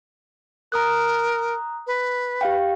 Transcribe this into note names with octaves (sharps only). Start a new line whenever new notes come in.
A#4 A#5 D#6 F#6
B4
G4 F5 G5